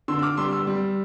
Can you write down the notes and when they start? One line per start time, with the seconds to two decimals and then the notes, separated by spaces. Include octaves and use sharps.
0.08 D3 C6 E6
0.19 E6
0.22 D6 F6
0.37 G3 C6 E6
0.52 C6 E6
0.67 G3